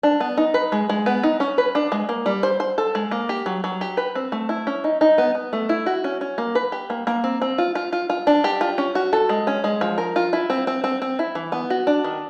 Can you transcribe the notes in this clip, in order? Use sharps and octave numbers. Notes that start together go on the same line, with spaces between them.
D4
B3
D#4
B4
G#3
G#3
B3
D#4
C#4
B4
D4
G#3
A#3
G3
C5
C5
A4
G#3
A#3
G4
F#3
F#3
G4
B4
C4
A3
E4
C#4
D#4
D#4
B3
B3
A3
E4
F#4
C#4
C#4
A#3
B4
G4
A#3
A#3
C4
C4
F4
F4
F4
F4
D4
G4
F4
C#4
F#4
A4
G#3
C#4
G#3
F3
A#4
F4
E4
C4
C4
C4
C4
E4
E3
B3
F#4
D4
D#3